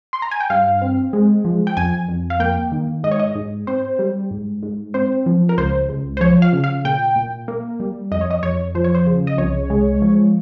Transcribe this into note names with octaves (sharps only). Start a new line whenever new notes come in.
C6
A#5
G#5
G5
G2 F5
C4
G#3
F3
G5
F2 G#5
F2
F5
A#3 G5
D#3
G#2 D#5
C#5
D#5
G#2
C4 C5
G3
G#2
G#2
C4 C5
F3
A#4
C#2 C5
C#2
C5
F3 C#5
F5
C#3
F5
A#2 G5
A#2
A#3
G3
F2 D#5
C#5
D#5
F2 C#5
F3 C5
C#5
C5
C#3
D#5
C2 C#5
G#3
F3